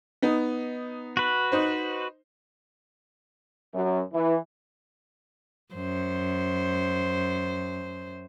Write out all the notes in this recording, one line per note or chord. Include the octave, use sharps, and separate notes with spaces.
B3 D#4
F#4 B4
D#4 C5
F#2
E3
F#2 C5